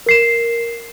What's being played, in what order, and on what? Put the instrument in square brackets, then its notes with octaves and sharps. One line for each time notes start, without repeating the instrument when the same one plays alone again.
[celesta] A#4 C7 E7